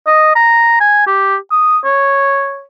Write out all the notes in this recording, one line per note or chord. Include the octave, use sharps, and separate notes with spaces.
D#5
A#5
G#5
G4
D#6
C#5